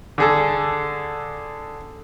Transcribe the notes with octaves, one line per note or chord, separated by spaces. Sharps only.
D3 G#4 A4